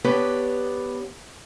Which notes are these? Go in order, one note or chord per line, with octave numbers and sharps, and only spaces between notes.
B3 D4 G4 B4 C#5